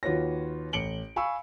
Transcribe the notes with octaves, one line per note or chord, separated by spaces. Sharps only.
D#2 F4 F#4 B4 C#5 A#6
A1 C#7 D7 F#7 G7
F5 G#5 B5 C#6 E6